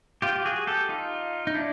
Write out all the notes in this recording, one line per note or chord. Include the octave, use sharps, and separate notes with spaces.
F4 G4
F#4 G#4
G4 A4
D#4 F4
D#4
D4 E4